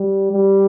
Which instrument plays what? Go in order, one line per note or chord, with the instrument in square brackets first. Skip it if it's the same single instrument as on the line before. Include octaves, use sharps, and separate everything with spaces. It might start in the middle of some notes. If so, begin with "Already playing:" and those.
Already playing: [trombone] G3
G3